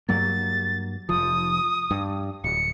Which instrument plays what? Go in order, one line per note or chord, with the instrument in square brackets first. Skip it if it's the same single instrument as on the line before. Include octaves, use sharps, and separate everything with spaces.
[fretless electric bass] G2 F#3 A#3 [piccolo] A6
[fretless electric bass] F1 F3 [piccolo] D#6
[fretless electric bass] G2
[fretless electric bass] D1 [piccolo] C#7